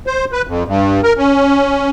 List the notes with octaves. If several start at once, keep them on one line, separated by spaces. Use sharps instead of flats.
C5
B4
F2
G2
A#4
C#4